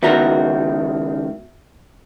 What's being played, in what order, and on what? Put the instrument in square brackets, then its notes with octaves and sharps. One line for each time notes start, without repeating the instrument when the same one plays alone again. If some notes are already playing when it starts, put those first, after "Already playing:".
[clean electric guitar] C#2 D#3 [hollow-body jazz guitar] B3 F#4 A#4 [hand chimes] E5